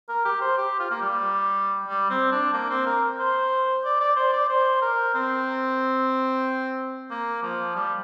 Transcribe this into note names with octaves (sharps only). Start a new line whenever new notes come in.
A#4
G4
C5
G4
F4
A#3
G3
G3
C4
D4
A#3
C4
A#4
C5
D5
D5
C5
D5
C5
A#4
C4
A#3
F3
G3